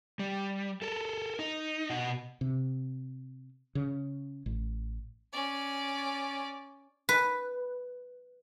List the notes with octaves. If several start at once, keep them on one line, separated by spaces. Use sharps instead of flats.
G3
A4 A#4
D#4
B2 D#5 F#5
C3
C#3
A1
C#4 D5
B4